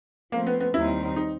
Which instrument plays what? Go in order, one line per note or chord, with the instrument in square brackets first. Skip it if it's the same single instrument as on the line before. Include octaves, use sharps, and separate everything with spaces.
[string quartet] F3 A3 C4 [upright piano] A#3
[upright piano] B3
B3
[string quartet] D#2 D#3 G3 C4 D#4 [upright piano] E4
[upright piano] D#4